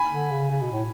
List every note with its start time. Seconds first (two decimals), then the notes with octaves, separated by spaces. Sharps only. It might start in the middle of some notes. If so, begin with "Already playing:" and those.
Already playing: G#5 B5
0.12 D3
0.31 C#3
0.50 C#3
0.62 B2
0.72 A2